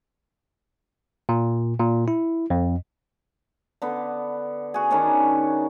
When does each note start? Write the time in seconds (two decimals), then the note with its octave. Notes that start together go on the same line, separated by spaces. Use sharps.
1.29 A#2
1.80 A#2
2.08 E4
2.50 F2
3.82 D3 B3
4.74 F#4 G#4
4.91 D#3 C#4 D4